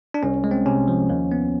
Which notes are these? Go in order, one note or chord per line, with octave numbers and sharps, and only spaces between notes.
D4
C2 C#4
G#3
C4
C3 C#4
F3
D#2
B3